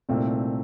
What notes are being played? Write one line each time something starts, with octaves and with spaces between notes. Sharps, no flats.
C2 A#2 A3 C4 D#4